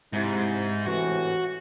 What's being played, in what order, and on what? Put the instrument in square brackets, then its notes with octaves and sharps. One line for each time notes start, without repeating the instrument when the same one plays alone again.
[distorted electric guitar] G#2 [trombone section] C3 E4
[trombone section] A2 C3 E3 [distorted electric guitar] F#4